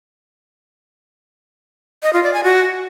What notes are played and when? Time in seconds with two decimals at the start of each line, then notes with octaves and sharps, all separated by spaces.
2.03 D#5
2.13 F4
2.23 D5
2.34 G#5
2.44 F#4